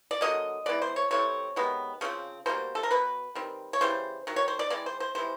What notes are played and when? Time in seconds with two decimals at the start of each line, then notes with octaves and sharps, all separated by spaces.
0.11 D5
0.21 D3 F#3 A#3 D#5
0.66 E3 G#3 B3 D5
0.82 C5
0.96 C#5
1.11 C3 E3 A3 C4 C#5
1.56 C3 D#3 G#3 B3
2.01 C#3 F3 C4
2.46 B2 G3 A#3 C5
2.75 A4
2.83 A#4
2.91 B2 F#3 B4
3.35 D#3 G3 C4
3.73 C#5
3.81 C#3 E3 G3 C5
4.27 D#3 F#3
4.36 C#5
4.48 C5
4.59 D5
4.70 E3 G#3 C4 D5
4.86 C5
5.00 C5
5.15 C3 E3 G#3 C5